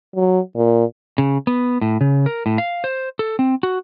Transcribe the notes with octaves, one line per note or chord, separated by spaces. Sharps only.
F#3
A#2
C#3
B3
A2
C#3
A#4
A2
F5
C5
A4
C4
F#4